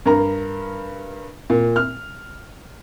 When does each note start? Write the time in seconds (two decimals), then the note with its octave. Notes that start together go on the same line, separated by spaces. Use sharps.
0.06 G2 A#4 A#5
1.50 A#2
1.76 F6